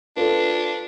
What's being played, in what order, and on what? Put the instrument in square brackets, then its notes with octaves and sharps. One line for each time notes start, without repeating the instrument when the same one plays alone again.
[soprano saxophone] D4 [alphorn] F4 [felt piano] A4 B4